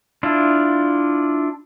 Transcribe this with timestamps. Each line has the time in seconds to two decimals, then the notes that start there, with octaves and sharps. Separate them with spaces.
0.23 D4 E4 F4